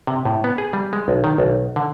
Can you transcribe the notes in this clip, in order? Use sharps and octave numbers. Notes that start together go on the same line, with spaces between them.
C3
A2
B3
G#4
G3
G#3
B1
D#3
B1
D3